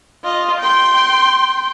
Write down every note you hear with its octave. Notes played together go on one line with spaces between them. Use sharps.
F4 D#5
G5 C6